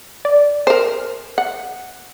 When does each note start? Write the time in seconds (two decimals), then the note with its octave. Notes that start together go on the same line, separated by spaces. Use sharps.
0.25 D5
0.67 A#4 C5
1.38 F#5